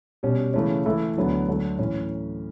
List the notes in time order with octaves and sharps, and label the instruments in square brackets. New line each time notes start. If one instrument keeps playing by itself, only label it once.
[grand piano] B2 G3 C#4
C#3 E3 A3 C#4
E3 A3 E4 A4
D2 D3 F#3 B3
D2 D3 F#3 A3
A2 E3 C#4